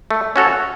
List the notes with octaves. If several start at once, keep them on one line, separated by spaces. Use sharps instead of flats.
A3
C#4 F#4 A4 C#5